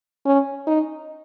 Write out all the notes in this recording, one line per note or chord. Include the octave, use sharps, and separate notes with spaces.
C#4
D#4